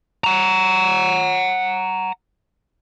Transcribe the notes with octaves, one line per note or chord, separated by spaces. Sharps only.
F#5 A#5